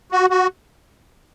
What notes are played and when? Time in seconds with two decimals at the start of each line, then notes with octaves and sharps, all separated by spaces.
0.12 F#4
0.30 F#4